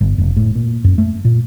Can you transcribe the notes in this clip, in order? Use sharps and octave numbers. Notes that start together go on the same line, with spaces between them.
G1
F1
A2
A#2
F#2
A3
A#2